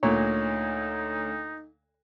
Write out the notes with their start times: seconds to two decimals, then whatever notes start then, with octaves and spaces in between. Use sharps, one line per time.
0.03 D2 A#2 D#4 C#5